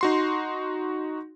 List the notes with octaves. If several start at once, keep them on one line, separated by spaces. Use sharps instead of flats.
D#4 F#4 C6